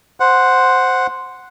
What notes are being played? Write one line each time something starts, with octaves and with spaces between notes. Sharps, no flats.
C5 F#5